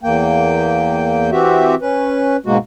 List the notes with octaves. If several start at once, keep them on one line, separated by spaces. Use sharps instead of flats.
E2 A#3 G5
E3 C4 F#4 G4 E5
C#4 B4
G#2 B2 G#3 A#3 F#4